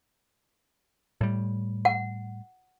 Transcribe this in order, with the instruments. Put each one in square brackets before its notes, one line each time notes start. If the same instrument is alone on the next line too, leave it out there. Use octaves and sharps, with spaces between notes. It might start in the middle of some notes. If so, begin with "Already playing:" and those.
[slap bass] A2 G3
[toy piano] F#5